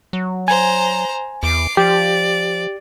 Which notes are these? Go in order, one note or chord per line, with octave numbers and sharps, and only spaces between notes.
F#3
C5 G#5 A#5
E2 D6 C7
F3 G4 D5